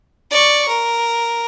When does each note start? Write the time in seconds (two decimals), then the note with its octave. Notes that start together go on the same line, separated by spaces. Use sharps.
0.31 D5 C#6
0.68 A#4